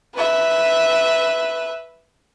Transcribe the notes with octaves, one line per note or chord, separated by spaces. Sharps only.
B4 E5